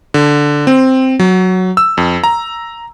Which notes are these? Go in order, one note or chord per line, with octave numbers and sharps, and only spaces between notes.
D3
C4
F#3
E6
F2
A#5